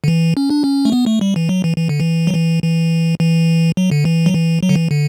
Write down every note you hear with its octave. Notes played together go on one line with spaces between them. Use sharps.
D3
E3
C#4
D4
C#4
A3
B3
A3
G3
E3
F#3
E3
E3
D3
E3
F#3
E3
E3
E3
F#3
D3
E3
F#3
E3
F#3
D3
E3
D3